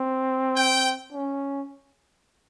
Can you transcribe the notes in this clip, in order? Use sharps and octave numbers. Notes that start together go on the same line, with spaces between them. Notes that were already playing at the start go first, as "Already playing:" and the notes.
Already playing: C4
G5
C#4